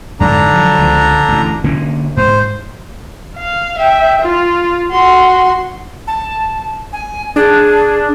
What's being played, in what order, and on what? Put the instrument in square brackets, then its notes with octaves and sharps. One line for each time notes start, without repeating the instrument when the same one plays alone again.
[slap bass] F2 G#2 [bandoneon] D3 D4 A#5
[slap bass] F3 F#3
C#2 F3
A1 D2
D3 A#3 C#4
[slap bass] G#2 [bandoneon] C5
[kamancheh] F5
E5 G5
F4
F#4 C6
[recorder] A5
G#5
[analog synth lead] D4 [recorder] G#4